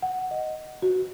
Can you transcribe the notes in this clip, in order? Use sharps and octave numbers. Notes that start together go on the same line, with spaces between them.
F#5
D#5
F#4